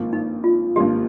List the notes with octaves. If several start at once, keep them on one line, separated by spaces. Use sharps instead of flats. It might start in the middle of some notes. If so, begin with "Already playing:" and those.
Already playing: G#1 G2 F3 A#3 F4
D#4
F4
G#1 G2 F3 A#3 F4 G4